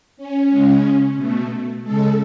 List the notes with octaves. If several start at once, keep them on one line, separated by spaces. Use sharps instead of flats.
C#4
C#3 G#3
B2 A3
C#3 G#3 A4